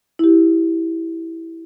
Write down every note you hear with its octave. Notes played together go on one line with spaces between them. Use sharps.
E4 G4